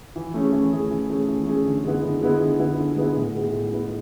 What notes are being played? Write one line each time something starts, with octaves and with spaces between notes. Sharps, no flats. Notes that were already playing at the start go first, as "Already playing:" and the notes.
E3
A3 C#4 G#4
E3
A3 C#4 G#4
E3
A3 C#4 G#4
E3
A3 C#4 G#4
D3
G#3 B3 E4
D3
G#3 B3 E4
D3
G#3 B3 E4
D3
G#3 B3 E4
A2
G#3 B3 E4
A2
G#3 B3 E4